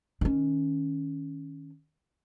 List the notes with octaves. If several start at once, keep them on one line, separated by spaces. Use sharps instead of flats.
D#3 C#4